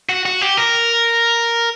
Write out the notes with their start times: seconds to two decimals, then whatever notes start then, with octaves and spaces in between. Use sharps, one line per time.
0.09 F#4
0.26 F#4
0.41 G4
0.57 A#4